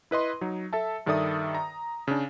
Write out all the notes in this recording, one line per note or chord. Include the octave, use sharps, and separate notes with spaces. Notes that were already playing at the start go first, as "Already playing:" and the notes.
E4 B4 D#5 C6
F#3 D#4
A4 E5 A5
G2 D#3 A4 D5 E5 D#6
A#5
C#3 D4